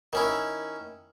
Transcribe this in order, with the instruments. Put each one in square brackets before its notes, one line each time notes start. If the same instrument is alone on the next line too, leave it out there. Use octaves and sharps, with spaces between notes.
[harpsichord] D#3 C#4 E4